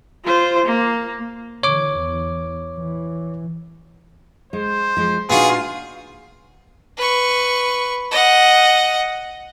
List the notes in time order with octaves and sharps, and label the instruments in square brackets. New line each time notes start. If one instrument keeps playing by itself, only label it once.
[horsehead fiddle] F4 C5
A#3
[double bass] D3 E3 [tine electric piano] C#5 D6
[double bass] E2
E3
[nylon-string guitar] G#3 [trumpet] C5
[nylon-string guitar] F3 G#3
[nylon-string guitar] A#2 D4 D#4 [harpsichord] B3 F#4 [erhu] F4 [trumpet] G#4
[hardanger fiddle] B4 C#6
D#5 F#5